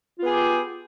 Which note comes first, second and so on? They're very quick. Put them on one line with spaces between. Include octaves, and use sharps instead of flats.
F4 B3 G#4 G4